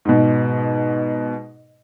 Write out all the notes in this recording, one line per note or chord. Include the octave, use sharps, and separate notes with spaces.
G#2 B2